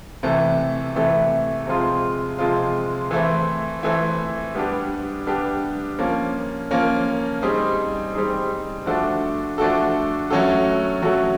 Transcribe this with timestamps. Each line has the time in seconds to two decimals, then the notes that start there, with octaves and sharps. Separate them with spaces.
0.23 C3 E3 A3
0.96 C3 E3 A3
1.67 C3 F3 G#3 C4 F4
2.39 C3 F3 G#3 C4 F4
3.11 E3 A3 C4 E4
3.83 E3 A3 C4 E4
4.55 G3 B3 D4 G4
5.27 G3 B3 D4 G4
5.98 F3 A#3 C#4
6.71 F3 A#3 C#4
7.42 G3 C4 D#4 G#4
8.14 G3 C4 D#4 G#4
8.86 F3 A3 D4 F#4 A4
9.58 F3 A3 D4 F#4 A4
10.30 F#3 A3 C#4 F#4 A4
11.02 F#3 A3 C#4 F#4 A4